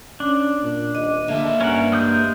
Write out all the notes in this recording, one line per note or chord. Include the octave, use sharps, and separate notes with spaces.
C#4 D4
A#2
D#1 D#5
D3 A#3 E5 A5
G2 C#4 A#4 F#5
G#3 D#6 G6